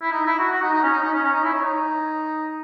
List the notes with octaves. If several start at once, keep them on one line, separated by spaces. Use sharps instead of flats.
E4
D#4
E4
F#4
F#4
D#4
D#4
C#4
D#4
D#4
C#4
C#4
D#4
E4
C#5
D#4